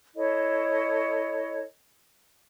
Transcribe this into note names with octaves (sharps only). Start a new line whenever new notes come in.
E4 A4 C#5 D#5